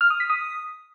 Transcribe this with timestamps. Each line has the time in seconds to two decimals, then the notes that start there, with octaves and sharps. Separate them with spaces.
0.01 F6
0.10 D#6
0.20 B6
0.30 D#6